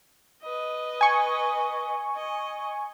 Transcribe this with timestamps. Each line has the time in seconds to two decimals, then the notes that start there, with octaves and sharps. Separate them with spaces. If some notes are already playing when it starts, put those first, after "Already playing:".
0.43 B4 D#5
1.01 G#5 C#6
2.15 D#5